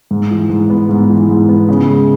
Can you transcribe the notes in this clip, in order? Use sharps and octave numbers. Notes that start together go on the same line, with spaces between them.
G#2
E3
G#2
B3
G#2
E3
G#2
B3
C#3
G#3